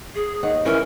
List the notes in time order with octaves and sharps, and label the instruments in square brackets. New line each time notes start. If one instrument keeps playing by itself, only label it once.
[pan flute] G#4
[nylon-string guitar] D#2 F#5
[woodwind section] E3 [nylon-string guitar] C#4 [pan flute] A#4